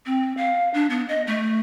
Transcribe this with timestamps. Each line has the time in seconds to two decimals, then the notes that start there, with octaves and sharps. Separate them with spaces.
0.06 C4
0.37 F5
0.74 D4
0.90 B3
1.08 D#5
1.27 A3